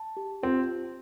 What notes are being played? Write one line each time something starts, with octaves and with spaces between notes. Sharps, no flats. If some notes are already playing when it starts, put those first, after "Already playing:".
Already playing: A5
G4
C4 F4